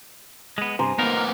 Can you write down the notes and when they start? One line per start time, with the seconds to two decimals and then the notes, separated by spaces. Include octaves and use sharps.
0.58 G#3 B3
0.79 G2 C3 C5 G#5 A#5
0.99 A#3 B3 D#4 F4 A#4